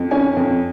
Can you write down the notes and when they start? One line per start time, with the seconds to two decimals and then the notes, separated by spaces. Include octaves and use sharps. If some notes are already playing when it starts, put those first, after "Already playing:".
Already playing: F2
0.11 C#4 G#5
0.37 F2